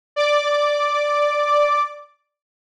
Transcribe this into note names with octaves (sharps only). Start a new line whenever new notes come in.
D5 D6